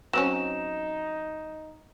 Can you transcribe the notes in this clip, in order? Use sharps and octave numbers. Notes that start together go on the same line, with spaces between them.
F#3 C4 C#4 D#4 E7